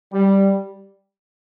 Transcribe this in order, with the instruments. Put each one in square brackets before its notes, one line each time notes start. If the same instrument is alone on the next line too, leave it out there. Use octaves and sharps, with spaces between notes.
[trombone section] G3